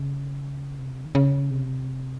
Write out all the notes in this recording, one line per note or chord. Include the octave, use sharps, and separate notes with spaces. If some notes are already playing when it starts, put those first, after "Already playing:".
Already playing: C#3
C3
D#3
C#3
C3